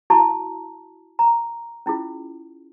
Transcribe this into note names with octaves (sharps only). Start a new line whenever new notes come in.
E4 F#4 A5 A#5 C#6
A#5
C#4 E4 F4 G#4